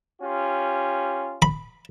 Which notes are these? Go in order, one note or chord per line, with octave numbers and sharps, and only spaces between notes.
C#4 F4 G4
B5